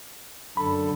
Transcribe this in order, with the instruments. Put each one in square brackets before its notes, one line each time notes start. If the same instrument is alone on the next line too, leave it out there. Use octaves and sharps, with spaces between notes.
[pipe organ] F#2 D3 A4 [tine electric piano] B5